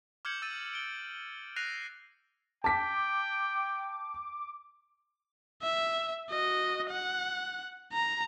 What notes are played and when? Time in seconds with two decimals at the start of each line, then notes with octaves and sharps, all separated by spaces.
0.25 D6 F6 G6 G#6 C#7 F#7
0.42 E6 A6 D#7
0.73 D7 G7
1.56 F#6 A#6 C7 D#7 F7
2.64 G5 A5 D6 B6
5.62 E5
6.30 F#4 D#5
6.90 F#5
7.92 A#5